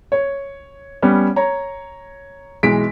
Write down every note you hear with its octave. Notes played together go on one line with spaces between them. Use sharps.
C#5
G3 B3 C#4
C#5 A#5
B1 E3 G#3 B6 D7